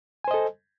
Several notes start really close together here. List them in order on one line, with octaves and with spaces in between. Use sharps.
G#5 C5 D#5 A4